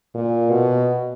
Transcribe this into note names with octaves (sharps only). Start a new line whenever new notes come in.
A#2
B2